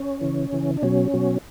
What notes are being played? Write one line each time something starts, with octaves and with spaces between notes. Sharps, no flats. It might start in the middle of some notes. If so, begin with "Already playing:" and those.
Already playing: C#4
C#3 E3
C#3 E3
D4
B2 F#3 C#4
B2 F#3